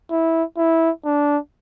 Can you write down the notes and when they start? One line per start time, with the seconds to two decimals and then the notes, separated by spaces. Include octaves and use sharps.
0.11 E4
0.58 E4
1.05 D4